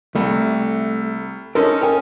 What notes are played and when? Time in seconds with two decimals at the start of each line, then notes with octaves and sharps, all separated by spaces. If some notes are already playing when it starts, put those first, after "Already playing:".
0.15 C2 A3
1.55 C#4 D#4 A4 A#4 C6
1.81 A#4 G5 G#5